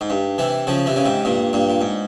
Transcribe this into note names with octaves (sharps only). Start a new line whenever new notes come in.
G#2
G2
C3 E3
C#3 F3
C3 E3
C#3
G#2 C3
G2 A#2
G2 A#2
A#2
G#2